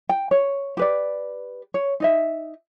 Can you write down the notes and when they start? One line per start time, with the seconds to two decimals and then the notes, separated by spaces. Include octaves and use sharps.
0.09 G5
0.31 C#5
0.77 G4 B4 D5
1.74 C#5
2.00 D#4 D#5 E5